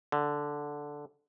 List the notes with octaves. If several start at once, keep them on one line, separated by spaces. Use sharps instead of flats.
D3